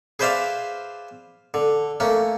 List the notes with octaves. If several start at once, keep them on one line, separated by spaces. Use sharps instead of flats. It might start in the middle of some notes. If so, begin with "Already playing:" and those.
G#4 B4 C5 D5 E5 F5
D3
A3 A#3 C#4